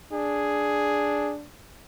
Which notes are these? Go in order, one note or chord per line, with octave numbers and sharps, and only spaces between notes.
D4 G#4